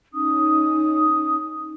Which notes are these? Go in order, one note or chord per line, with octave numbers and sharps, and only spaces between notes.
C#4 D#4 D#6